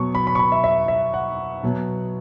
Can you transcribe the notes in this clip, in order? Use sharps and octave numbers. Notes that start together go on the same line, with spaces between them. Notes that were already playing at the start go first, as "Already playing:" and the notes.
Already playing: B2 F#3 B3 C#6
B5
B5
C#6
B5
E5
E5
E5
F#5
B2 F#3 B3